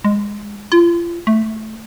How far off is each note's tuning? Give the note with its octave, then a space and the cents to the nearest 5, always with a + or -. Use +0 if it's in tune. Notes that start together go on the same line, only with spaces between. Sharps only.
G#3 -10
F4 -35
A3 -5